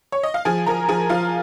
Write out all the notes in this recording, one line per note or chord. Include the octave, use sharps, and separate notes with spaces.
C#5
D#5
F5
F3 G#4 G#5
F3 A#4 A#5
F3 G#4 G#5
F3 F4 F5